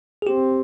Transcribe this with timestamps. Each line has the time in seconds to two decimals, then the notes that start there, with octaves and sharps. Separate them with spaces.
0.22 G#4
0.27 C4 G4